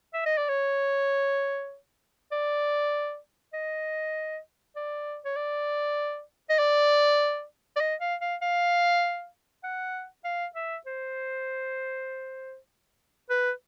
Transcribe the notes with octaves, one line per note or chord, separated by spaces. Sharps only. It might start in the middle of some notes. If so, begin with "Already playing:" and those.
E5
D#5
D5
C#5
D5
D#5
D5
C#5
D5
D#5
D5
D5
D#5
F5
F5
F5
F#5
F5
E5
C5
B4